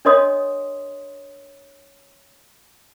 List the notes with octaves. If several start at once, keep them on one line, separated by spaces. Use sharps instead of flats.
D4 A#4 C#5 D#5 C6 D#6